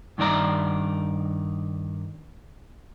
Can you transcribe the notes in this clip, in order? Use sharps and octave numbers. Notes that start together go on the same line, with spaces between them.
G2 D#3 D#4 D5 A#5